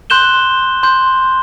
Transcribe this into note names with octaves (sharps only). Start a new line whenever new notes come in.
C6 F#6 G6 E7 G7
C6 G6